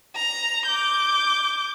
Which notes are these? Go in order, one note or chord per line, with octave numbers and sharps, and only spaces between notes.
A#5
D6 G6